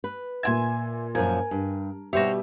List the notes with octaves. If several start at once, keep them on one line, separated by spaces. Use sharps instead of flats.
B4
A#2 E5 G5 G#5 C6 G#6
F#2 A#2 F3 A#4 G#5
G2
B2 G3 F#4 G4 C5 C#5 E5